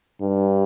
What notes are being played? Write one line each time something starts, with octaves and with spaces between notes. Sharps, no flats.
G2